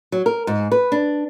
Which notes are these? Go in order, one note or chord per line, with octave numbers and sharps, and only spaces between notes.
F#3
A#4
G#2
B4
D4